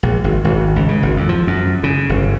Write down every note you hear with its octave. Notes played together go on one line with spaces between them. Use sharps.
A#1
G#1
G#1
C#2
C#3
G#1
F2
F3
F#2
C#3
G1